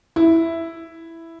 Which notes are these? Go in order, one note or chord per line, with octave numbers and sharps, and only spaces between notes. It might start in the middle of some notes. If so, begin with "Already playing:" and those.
E4